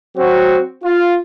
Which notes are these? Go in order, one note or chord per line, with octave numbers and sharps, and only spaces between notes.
F#3 C4 F#4
F4